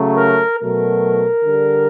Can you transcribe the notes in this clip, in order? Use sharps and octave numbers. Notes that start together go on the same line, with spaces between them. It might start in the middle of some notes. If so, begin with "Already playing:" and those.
Already playing: C#3 F#3 A3
A#4
B2 F#3 A3 A#4
D3 G3